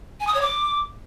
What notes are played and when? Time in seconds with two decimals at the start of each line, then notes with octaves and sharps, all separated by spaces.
0.20 G#5
0.27 D#6
0.34 C#5
0.42 D6